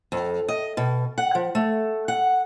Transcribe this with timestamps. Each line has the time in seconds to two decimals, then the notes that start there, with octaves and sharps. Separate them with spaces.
0.12 F2
0.48 D#5
0.77 B2
1.18 F#5
1.35 F3
1.55 A3
2.08 F#5